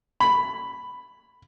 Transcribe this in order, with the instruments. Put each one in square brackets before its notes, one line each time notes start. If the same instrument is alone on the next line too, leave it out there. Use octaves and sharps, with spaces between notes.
[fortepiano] B5